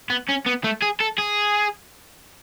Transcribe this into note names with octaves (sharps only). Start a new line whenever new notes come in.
B3
C#4
B3
A3
G#4
A4
G#4